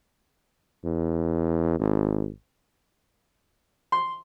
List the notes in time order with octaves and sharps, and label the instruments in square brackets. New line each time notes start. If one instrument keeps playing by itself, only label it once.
[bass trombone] E2
G#1
[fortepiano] C6